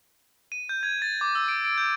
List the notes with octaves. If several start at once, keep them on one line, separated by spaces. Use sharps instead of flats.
D#7
G6
G#6
A6
D6
E6
D7
D7
G6